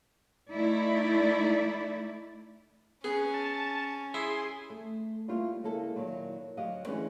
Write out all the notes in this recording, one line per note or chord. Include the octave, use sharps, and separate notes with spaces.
A3 D#4 E4 D5
B3 C#4 G#4
A5
E4 G#4 C6
A3
G3 A3 A#3 E4 F4
C#3 G#3 A#3 E4 A4
A#2 D#3 F#3 E4
D2 F#3 G4 D#5 F5
D3 E3 G#3 A3 C#4 B4